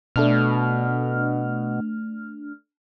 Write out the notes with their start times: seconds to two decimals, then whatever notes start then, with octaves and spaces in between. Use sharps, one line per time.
0.16 B2 A3 D4 F6